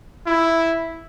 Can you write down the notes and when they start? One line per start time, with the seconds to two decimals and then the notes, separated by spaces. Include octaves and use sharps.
0.27 E4